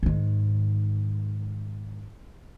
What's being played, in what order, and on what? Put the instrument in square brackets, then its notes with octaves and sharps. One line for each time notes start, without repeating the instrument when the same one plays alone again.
[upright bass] G#2 D#3